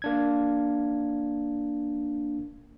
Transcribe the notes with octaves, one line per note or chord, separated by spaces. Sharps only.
A#3 D4 G#6